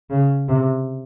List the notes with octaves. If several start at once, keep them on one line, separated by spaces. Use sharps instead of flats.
C#3
C3